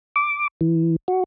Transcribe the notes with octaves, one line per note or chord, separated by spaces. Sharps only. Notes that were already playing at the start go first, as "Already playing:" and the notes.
D6
E3
F#4